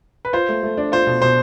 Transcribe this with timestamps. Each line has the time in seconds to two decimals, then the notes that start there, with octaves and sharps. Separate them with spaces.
0.25 B4
0.33 F4 C5
0.49 A3
0.63 A3
0.77 D4
0.92 F4 C5
1.07 B2
1.22 B2 C5